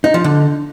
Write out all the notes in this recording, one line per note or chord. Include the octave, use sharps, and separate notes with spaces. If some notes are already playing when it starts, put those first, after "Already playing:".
D#4
F3
D3